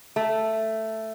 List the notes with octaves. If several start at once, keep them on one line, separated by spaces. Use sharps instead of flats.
A3